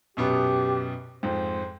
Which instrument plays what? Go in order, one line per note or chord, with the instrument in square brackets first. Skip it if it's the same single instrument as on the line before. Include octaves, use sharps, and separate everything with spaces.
[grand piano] F#2 B2 B3 [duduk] G4
[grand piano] F2 G#2 [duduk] C5